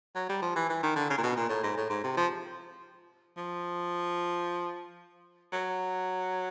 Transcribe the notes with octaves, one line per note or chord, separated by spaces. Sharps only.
F#3
G3
F3
E3
E3
D#3
D3
C#3
A#2
B2
A#2
A2
G#2
A2
G#2
C3
F3
F3
F#3